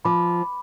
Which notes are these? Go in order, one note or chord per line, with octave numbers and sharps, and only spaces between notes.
F3 B5 D6